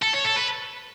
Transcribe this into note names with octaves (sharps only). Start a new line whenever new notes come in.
A4
C#5
A4
B4